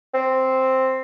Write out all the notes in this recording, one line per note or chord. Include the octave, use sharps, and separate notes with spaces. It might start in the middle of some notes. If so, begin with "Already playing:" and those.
C4